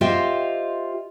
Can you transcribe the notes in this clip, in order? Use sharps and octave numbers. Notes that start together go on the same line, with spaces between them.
F4 G4 C5 D#5 E5 G5